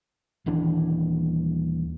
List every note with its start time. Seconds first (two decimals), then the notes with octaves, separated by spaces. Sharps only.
0.46 D#1 D#2 E3 D4